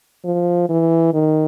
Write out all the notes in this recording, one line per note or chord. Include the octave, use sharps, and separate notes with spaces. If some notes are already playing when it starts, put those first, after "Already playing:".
F3
E3
D#3